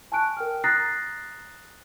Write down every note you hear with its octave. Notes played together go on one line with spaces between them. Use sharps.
G#5 A5 C#6 F#6 D7
A#4 G5 F6
A#5 D#6 F#6 A6 A#6 C7